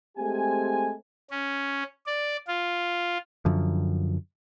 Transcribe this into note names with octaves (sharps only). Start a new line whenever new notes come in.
G#3 A3 C4 G4 G#5
C#4
D5
F4
F#2 D3 F3